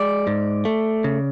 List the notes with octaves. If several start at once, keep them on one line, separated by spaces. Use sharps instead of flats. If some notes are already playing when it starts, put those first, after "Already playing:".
Already playing: G#3 D5
G#2
A3
C#3